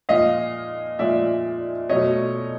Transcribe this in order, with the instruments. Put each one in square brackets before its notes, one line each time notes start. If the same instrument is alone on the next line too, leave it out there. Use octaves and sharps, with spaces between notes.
[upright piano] A#2 F3 G#3 D#5 F5
A#2 F3 G#3 D5 E5
B2 F#3 A3 C#5 D#5